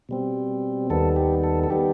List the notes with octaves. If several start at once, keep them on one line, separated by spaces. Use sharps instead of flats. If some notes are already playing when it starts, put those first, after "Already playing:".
B2 G3 C4
D#2 D#3 G3 B3 A4
G4
A4
A4
D#3 G3 B3 G4